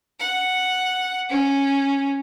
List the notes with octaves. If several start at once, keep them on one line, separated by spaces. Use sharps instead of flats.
F#5
C#4